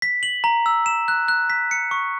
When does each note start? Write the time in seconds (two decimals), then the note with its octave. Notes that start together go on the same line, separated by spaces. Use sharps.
0.02 B6
0.23 F#7
0.44 A#5
0.66 E6
0.86 E7
1.08 F#6
1.28 F#6
1.50 B6
1.71 C#7
1.91 C#6